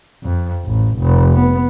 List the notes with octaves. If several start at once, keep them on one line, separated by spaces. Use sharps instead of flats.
F2
A1
F1
B3